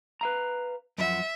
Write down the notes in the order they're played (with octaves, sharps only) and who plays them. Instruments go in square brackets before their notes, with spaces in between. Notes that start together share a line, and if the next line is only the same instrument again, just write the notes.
[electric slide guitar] B4 F5 A#5
[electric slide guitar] F#2 F3 F#5 [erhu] E5